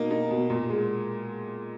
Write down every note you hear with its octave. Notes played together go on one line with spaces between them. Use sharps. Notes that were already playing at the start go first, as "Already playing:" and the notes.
Already playing: B2 A#3 D#4
D#4
B2
A#2
G#3